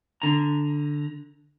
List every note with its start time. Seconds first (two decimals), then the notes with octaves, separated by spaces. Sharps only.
0.22 D3 A#5